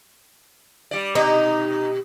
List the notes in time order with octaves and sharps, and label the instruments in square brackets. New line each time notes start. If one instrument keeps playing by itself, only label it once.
[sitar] G3 D5
[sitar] B2 G4 [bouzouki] D#4